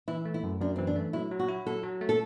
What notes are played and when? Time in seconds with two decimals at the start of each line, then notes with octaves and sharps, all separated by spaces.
0.08 E3 E4
0.25 A3
0.34 E4
0.43 F#2
0.61 F#2 D4
0.76 E3 C4
0.87 D4
0.96 A3
1.13 F#3 E4
1.31 F#3
1.39 F#4
1.48 E4
1.66 F#3 A4
1.83 F#3
2.01 A3
2.09 A4